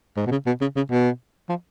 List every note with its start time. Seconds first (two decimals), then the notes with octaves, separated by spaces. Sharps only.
0.16 G#2
0.26 B2
0.31 C#3
0.46 B2
0.61 C#3
0.76 C#3
0.91 B2
1.49 F3